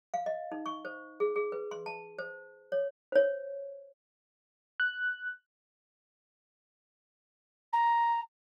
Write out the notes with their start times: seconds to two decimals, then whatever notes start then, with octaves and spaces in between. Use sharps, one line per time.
0.14 F5
0.26 D#5
0.52 D#4
0.66 C#6
0.85 C5
1.20 G#4
1.36 G#4
1.52 B4
1.71 C6
1.86 A5
2.19 C5
2.72 C#5
3.12 C5 C#5
4.80 F#6
7.73 A#5